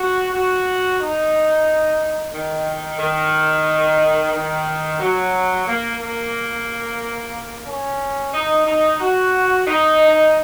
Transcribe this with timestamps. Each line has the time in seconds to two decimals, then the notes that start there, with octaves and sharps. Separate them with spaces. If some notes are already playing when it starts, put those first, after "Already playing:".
Already playing: F#4
0.33 F#4
1.00 D#4
2.33 D#3
3.00 D#3
4.33 D#3
5.00 F#3
5.67 A#3
6.01 A#3
7.66 C#4
8.34 D#4
8.67 D#4
9.00 F#4
9.67 D#4